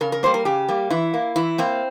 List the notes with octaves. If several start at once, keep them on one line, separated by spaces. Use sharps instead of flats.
C#3 A#4
A#4
G3 A#3 C5
A#4
C#3 G4
G3 A#3
E3 E4
A#3
E3 E4
A#3 C4